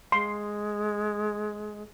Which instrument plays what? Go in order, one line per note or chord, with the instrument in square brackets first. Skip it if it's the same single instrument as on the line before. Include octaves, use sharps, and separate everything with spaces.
[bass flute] G#3 [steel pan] C6